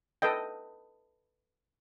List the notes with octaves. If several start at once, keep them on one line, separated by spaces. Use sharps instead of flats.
A4 B4 D#5 G5